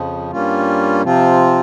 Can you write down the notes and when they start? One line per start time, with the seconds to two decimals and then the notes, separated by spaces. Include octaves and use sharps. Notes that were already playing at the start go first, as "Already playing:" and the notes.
Already playing: F2 C#3 F3
0.30 G2 G3 A#3 C#4 F4
1.03 C3 F3 C4 F4